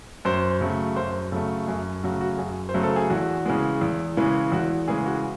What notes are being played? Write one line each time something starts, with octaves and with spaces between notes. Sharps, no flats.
F#2 C5
C#3 F#3 A3
F#2 C5
C#3 F#3 A3 A4
F#2 G#4
C#3 F#3 A3 F#4
F#4
F#2 G#4
C5
C#3 F#3 A3
A4
G#4
E2 F#4
C#3 E3 G#3
E2
C#3 E3 G#3
E2 F#4
C#3 E3 G#3 G#4
F#4
G#4